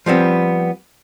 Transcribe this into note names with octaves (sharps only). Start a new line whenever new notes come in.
F3 G3 B3 C4